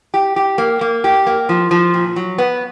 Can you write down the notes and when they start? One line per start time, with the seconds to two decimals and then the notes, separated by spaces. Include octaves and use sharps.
0.14 G4
0.36 G4
0.58 A#3
0.81 A#3
1.04 G4
1.26 A#3
1.49 F3
1.71 F3
1.94 A#2
2.16 F#3
2.38 B3